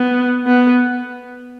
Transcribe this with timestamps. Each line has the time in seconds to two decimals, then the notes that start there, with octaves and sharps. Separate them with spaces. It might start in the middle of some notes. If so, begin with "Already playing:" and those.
Already playing: B3
0.46 B3